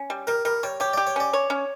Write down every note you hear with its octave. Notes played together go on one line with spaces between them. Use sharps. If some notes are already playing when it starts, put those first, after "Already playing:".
Already playing: C#4
G3
G3 A#4
G3 A#4
G3 C#5
G4 C#5
G4 D5
C#5
C#4 D5
C#5
C#4